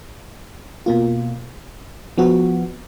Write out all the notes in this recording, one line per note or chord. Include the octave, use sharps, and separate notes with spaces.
B2 A#3 F4
F3 B3 F#4